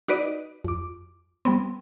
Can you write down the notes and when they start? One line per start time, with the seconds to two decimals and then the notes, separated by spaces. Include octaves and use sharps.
0.08 D#4 F#4 B4 D5 D#5
0.64 F2 D6
1.45 G3 B3 C4